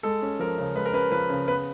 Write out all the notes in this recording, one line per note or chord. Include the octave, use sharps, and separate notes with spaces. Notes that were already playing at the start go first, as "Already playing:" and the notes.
G#3 A4
C#4
F3 A#4
C#3
G#3 B4
A#4
C#4 B4
F3 B4
C#3
B3 B4